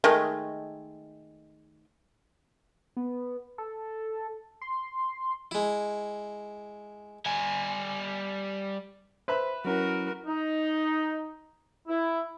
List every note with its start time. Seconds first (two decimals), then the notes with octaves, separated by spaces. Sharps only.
0.04 D#3 G#3 A3
2.97 B3
3.58 A4
4.61 C6
5.51 G#3 E4
7.26 G3 G#5
9.28 B4 C5 E5 B5
9.65 F#3 C#4 E4 F#4 A#4
10.27 D#4
11.88 E4